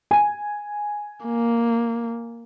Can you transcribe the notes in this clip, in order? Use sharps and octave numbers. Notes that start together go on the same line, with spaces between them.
G#5
A#3